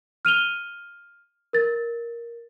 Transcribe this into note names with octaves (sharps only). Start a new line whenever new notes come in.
F6 D#7 F7 G7
A#4 A6